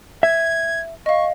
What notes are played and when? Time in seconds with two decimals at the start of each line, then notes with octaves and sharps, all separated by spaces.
0.23 E5 G#6
1.06 D#5 F5 C#6